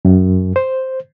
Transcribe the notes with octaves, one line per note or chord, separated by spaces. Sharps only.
F#2
C5